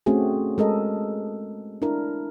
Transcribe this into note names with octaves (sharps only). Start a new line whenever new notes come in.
A3 C4 C#4 F#4 G#4
G#3 A4 A#4 D#5
D4 E4 A#4